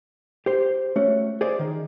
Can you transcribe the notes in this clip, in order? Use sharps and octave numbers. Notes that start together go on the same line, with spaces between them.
G4 C5
A3 C#4 F#4
G#4 C5 D5 E5
D#3